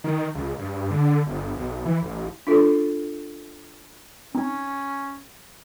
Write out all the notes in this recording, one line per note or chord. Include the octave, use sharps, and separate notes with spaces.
D#3
C#2
G2
D3
G1
B1
E3
A1
D4 F4 A4
C4 C#4 D#4